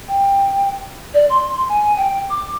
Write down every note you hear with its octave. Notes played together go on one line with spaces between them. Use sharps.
G5
D5
C6
G#5
G5
D6